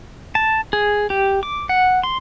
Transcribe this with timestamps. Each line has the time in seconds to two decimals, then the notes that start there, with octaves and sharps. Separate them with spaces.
0.35 A5
0.73 G#4
1.10 G4
1.43 D6
1.69 F#5
2.03 C6